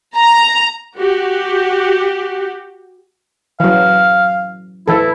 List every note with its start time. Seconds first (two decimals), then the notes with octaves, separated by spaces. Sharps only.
0.16 A#5
0.98 F#4 G4
3.60 E3 F#3 F5
4.88 E3 E4 A4